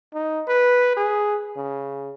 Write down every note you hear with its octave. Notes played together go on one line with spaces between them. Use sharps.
D#4
B4
G#4
C#3